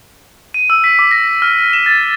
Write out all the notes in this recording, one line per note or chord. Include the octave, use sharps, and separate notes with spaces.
D#7
E6
B6
D6
A#6
F6
E7
A6